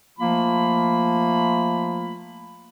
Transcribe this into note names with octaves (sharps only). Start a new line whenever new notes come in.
F3 A3 A#3 F4 B5